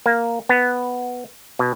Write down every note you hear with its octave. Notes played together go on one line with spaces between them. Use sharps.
A#3
B3
B2